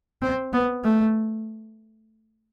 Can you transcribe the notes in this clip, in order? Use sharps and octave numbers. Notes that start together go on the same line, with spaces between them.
C4
B3
A3